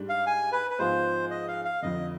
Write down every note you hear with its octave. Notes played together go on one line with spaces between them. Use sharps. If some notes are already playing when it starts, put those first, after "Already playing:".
Already playing: G#2 G3 D4
F5
G#5
B4
B4
G#2 F3 B3 F4 G#4 C5
D#5
F5
F5
F1 F2 D3 D#5